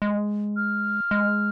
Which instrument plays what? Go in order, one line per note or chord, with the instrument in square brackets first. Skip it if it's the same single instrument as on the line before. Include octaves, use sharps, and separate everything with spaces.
[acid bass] G#3
[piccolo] F6
[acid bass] G#3